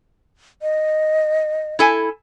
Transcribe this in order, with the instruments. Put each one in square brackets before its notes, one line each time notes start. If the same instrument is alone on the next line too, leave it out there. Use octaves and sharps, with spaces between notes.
[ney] D#5
[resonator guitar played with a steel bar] E4 A4 G#5